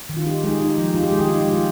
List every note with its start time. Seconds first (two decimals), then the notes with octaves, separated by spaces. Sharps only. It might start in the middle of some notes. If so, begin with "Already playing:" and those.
0.09 D#3
0.17 F4
0.26 D#4 G4
0.44 G#3 D#4 G#4
0.60 D#4 G4
0.78 F3
0.94 D#4 F4
1.04 G4
1.12 D#3 G#3 G#4
1.20 G4
1.29 D#4 F4
1.41 G4
1.47 G#3
1.53 F4